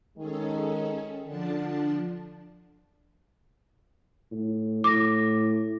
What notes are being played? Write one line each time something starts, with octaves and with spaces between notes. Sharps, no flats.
D#3 G#3 C#4 G#4 A4
D3 F3 D4 A5
A2
A2 D6 A#6